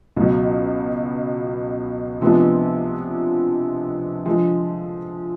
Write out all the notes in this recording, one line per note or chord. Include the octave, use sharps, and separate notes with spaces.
C#2 B2 F#3
C3 F3 G#3 B3 D4
D3 F3 G#3